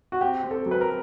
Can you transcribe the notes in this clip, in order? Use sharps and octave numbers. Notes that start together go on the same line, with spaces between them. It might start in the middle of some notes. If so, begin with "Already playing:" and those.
F#4
C4 G4
C4
A4
F#3
B4
A#4